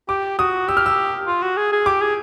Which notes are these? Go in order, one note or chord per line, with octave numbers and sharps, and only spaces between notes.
G4 D6
F#4 D#6
G4 E6
F6
E6
F4
F#4
G#4
G#4
G4 D6
G#4